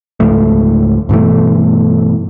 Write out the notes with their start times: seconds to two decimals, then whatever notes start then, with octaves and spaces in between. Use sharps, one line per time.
0.20 C#2 G#2 F3 A3
1.09 G2 B2 E3 A3